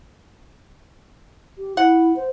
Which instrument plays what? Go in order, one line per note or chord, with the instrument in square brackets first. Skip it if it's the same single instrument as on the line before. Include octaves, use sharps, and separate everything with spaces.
[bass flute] G4
[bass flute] E4 [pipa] F#5
[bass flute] C5